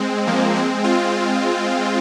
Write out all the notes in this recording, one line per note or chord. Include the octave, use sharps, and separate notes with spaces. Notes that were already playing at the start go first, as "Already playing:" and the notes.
Already playing: G#3 C4
F3 A#3
G#3 C4
C4 F4